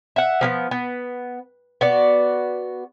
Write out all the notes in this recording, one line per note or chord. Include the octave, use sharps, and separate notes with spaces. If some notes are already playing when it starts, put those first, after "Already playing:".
E5 F#5
F3 A#3 B3
B3
B3 F#4 D5